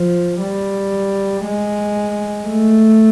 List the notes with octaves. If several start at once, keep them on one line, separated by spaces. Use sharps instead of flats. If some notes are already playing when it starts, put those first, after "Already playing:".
Already playing: F3
G3
G#3
A3